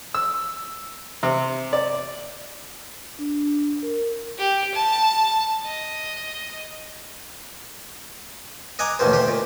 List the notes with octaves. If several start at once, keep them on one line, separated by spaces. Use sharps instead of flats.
E6
C3
D5
D4
A#4
G4
A5
D#5
D#5 F#5 G#5 A#5 D6
A1 D#2 B2 C5
D2 G4 C6
A#2